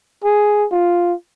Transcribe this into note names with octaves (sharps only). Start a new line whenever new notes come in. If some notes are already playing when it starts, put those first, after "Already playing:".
G#4
F4